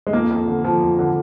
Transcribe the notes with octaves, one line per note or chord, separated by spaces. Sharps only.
G#3
F2 A#3
F2
D3
F3
F2
D3